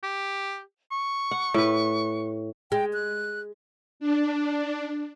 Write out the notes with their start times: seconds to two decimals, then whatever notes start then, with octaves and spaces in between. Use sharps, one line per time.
0.03 G4
0.92 C#6
1.31 F#5
1.54 A2 B4
2.72 G#3 G5
2.93 F#6
4.00 D4